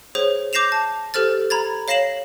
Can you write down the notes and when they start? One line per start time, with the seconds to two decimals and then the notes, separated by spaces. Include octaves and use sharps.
0.15 G#4 C5 C#5
0.53 D6 G6 A#6 C7 E7 F7
0.72 A5
1.14 G4 A4 C5 F6 A6
1.50 A#5 B5 G#6 A6
1.88 C#5 F5 A#6 C7 E7 F#7